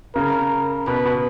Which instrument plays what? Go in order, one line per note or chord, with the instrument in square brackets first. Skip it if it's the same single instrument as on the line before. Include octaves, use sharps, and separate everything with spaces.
[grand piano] C#3 [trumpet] A#4
[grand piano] B2 [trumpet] B4
[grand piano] B2